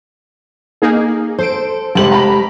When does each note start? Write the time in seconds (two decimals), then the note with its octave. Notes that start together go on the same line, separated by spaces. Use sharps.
0.82 A#3 D#4 G#4
1.39 A4 C5 D7
1.95 F1 G#3 G4 A5 F#7
2.12 A#5 B5